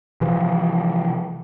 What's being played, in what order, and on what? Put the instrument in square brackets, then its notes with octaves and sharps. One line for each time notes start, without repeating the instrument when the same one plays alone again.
[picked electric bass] C3 E3 F3